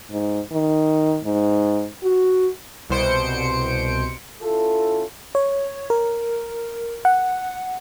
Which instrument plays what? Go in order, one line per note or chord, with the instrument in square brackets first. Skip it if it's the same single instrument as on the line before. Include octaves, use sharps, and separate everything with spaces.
[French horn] G#2
D#3
G#2
F#4
[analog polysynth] C2 B2 C5 C#7 D7
[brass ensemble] C#4 E4 F4 A4
[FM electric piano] C#5
A#4
F#5